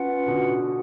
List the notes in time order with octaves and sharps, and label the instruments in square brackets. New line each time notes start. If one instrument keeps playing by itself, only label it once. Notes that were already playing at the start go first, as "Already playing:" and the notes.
Already playing: [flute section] C#4 F4 B4 F#5
[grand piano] B2 D3